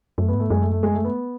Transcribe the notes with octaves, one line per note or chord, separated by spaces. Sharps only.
F#2 A3
B3
G#2
A3
F#2 G#3
A3
A3
G#3
A3
B3